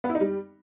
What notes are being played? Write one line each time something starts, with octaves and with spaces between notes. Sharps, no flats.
B3
E4
D#4
G3